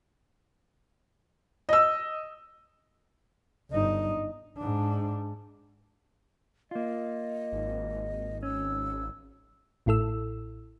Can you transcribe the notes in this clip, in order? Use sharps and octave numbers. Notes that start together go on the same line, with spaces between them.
D#5 E6
G1 D#4
G#2 D4
A#3 F4 D#5
G#1
C#4 E6
A1 A2 E4 A4 E6